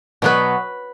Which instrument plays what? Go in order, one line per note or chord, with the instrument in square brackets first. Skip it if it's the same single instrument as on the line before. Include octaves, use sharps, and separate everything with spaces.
[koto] B2 F#3 B3 B4